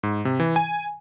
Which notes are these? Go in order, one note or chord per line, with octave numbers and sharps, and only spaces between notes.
G#2
C3
E3
G#5